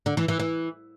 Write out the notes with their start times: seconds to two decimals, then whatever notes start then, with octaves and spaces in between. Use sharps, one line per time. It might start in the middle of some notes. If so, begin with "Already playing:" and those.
0.06 D3
0.17 E3
0.28 E3
0.40 E3